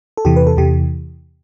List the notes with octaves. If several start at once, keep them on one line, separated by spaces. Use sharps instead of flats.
A4
E2 C3 E3 G4
B4
A4
E2 C3 E3 G4